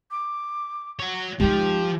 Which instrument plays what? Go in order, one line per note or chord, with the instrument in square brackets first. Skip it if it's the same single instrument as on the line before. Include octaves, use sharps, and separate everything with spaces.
[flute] D6
[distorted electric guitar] F#4 C#5
[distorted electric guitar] F3 [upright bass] G#3 D#4 [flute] G4